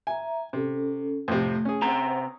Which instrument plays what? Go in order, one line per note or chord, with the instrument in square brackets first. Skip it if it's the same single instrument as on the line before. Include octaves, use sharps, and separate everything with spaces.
[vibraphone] E5 A#5 [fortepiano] G#5
[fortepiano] C3 [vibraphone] C#4 A4
[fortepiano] F2 A2 C3 [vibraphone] A3
[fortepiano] C#4 G#4
[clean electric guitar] C3 C4 A#5 [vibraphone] B4 C5 F#5